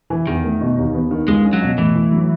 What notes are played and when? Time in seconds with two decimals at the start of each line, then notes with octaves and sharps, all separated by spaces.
0.10 E3
0.27 E2 D#3
0.44 A3
0.61 B2
0.78 D#2
0.94 B3
1.11 D#3
1.28 C#2 G#3
1.44 C#4
1.53 F#3
1.62 B2
1.78 A2 E3
1.95 A2
2.12 F#3